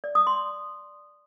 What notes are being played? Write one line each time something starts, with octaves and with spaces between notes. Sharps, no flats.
D5
D#6
C6